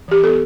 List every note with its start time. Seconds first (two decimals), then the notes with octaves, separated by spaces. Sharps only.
0.08 E3 G4
0.23 B3 A4